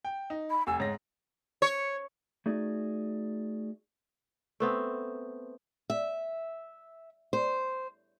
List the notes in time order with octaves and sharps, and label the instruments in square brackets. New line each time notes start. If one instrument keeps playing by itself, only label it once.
[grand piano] G5
D#4
[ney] B5
[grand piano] F1 E6 [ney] G#5
[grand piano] G#2 A#6 [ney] C#5
[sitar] C#5
[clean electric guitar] A3 D#4 F#4 G#4 D5
[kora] A3 B3 C4
[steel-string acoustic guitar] E5
C5